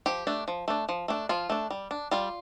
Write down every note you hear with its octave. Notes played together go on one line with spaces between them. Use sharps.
F3 G4
A3 D4
F3
A3 D4
F3
A3 D4
F3 F4
A3 D4
G3
D4
G3 F4